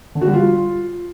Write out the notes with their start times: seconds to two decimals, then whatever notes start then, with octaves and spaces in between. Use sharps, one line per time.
0.15 D3
0.21 F#4
0.28 G3
0.34 F4